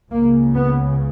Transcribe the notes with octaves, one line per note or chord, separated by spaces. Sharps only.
C#2 C#3 A#3
B3